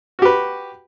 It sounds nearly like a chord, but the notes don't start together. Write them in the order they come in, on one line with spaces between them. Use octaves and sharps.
F#4 G4 B4